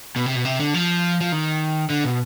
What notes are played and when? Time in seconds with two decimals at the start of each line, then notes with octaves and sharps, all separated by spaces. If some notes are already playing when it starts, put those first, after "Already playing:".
0.16 B2
0.26 C3
0.35 B2
0.45 C3
0.60 D3
0.74 F3
1.21 F3
1.32 D#3
1.90 D3
2.04 B2